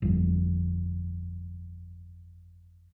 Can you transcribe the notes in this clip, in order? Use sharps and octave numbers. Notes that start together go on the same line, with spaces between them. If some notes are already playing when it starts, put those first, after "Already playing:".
G1 F2